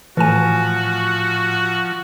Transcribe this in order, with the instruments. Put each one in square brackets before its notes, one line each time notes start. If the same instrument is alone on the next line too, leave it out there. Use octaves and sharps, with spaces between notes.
[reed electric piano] A2 [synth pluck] E3 G#5 [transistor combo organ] F3 [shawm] F#4